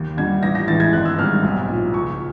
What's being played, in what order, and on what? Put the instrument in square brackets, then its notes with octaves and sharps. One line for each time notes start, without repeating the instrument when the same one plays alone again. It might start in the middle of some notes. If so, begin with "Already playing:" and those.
Already playing: [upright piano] D#2
D3 G3 G#6
A1 A#6
A#6
A2 E3 G#3 A6
G#6
G#1 F#6
E6
G#2 D#3 G3 F6
B1
A#2 F3
C#2 C#6